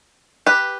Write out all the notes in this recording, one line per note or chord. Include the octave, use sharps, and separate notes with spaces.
G4 B4